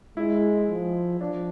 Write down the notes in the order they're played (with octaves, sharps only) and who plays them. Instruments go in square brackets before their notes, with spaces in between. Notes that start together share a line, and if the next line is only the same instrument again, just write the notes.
[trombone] G#3 [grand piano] E4
[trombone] F3
[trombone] F3 [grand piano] D4